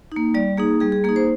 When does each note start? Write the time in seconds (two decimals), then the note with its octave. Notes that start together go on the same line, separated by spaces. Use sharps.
0.12 A#3 D#4
0.34 G3 D5
0.57 A#3 D#4 G#4
0.80 G3 G#4
0.92 G#4
1.04 A#3 G#4
1.09 D#4
1.16 C5